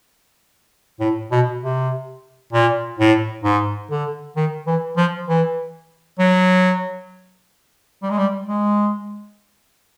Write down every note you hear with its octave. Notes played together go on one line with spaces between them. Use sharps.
A2
B2
C3
A#2
A2
G#2
D3
D#3
E3
F3
E3
F#3
G3
G#3
G3
G#3